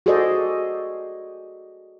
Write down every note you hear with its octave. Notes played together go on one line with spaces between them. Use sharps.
F#4 G#4 A4 C5 D5 D#5